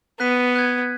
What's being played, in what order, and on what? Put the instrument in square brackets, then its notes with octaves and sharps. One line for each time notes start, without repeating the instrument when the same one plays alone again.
[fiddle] B3 [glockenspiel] F#6 B6 D#7
[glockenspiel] F#6 G#6